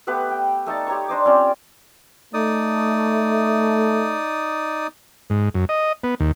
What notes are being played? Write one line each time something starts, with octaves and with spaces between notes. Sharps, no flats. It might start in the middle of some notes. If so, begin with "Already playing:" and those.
A3 B3 G4 B4
G5
A3 D#4 A4 A5
G4 C#5 A#5 C#6
D4 C5 D#5 D6
C4 C#4 F4 D5
A3 D#4 D5 D#6
G#2
F#2
D#5
B3
D#2